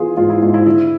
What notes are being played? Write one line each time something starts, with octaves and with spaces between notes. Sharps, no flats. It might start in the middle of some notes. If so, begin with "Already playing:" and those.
Already playing: E3 B3 F4 G#4
G#2 F4
E4
G#2 F4
E4
D3 E4